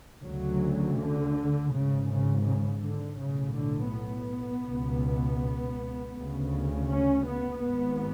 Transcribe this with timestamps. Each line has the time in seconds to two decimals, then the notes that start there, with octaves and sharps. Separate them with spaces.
0.25 D2 C#3 F#3
0.99 D3
1.73 G#1 G#2 C#3
2.10 C#3
2.46 C#3
2.84 D3
3.20 B1 A2 C#3
3.58 D3
3.94 B3
4.68 C#2 B2
6.16 D2 C#3
6.90 C#4
7.27 B3
7.63 G#1 G#2 B3